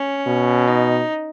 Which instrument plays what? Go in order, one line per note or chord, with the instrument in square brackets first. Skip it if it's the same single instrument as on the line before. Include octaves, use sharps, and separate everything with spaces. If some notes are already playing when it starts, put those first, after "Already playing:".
Already playing: [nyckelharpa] C#4
[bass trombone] B2
[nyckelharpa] D#4